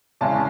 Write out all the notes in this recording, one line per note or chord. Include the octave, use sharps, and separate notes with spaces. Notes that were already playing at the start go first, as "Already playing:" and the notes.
E2 C#3 G#3 C#4 E4 A5